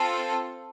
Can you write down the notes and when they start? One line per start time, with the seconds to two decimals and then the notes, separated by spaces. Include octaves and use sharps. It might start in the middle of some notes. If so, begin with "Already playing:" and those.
Already playing: C4 F4 A4